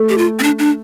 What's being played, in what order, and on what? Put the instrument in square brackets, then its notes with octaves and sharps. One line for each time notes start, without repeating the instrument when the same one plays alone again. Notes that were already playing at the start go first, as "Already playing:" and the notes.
Already playing: [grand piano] A3
[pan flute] G4
F4
C4
D4
D4